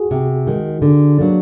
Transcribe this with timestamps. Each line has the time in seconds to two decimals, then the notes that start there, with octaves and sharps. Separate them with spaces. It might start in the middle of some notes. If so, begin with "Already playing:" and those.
Already playing: F#4 G#4
0.11 C3
0.47 D#3 G#3
0.82 D3
1.18 F#3 A#3 D4